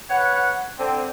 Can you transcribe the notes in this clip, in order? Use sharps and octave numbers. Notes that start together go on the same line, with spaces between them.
B4 C#5 F#5
D3 C4